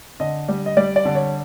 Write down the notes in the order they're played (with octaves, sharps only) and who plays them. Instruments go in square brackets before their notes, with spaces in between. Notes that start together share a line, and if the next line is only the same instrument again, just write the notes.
[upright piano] D3 D#5
G3
D#5
G3 D5
D5
D3
C#5